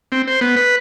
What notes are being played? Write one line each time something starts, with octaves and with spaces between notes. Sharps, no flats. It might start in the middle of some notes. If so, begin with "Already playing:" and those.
C4
C5
B3
B4